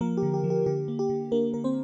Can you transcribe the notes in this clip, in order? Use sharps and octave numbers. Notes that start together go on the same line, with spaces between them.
F3 A#3 A#4
G4
D3
G4
F3
G4
D3 G4
A#3
G4
D3
A#3 D4 A#4
D3 A#4
C4 C5